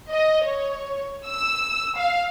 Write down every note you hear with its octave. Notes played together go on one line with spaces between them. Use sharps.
D#5
C#5
E6
F5